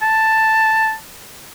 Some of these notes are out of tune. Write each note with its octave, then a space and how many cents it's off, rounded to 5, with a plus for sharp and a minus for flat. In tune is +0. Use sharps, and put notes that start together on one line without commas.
A5 +5